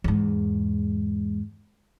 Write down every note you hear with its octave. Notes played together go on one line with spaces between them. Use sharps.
E2 G#2